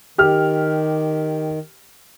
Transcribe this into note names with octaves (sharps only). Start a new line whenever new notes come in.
D#3 G4 F6